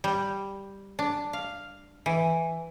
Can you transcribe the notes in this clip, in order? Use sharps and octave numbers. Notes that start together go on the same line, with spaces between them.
G3
D4
F5
E3